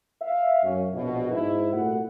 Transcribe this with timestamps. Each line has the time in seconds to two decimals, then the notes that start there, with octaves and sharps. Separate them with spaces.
0.21 E5 F5
0.63 F#2 C#4
0.93 A#1 B2
1.30 G#2 E4
1.73 C2 A#2 A3 F#4 F#5